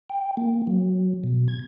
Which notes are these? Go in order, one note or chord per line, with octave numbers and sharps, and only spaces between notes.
G5
A#3
F#3
B2
G#6